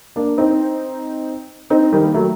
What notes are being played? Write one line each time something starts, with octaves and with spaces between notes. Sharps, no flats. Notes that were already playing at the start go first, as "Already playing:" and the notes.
A#3 D4
C4 D#4
C4 D#4
D#3 G3
A#3
F#3 A3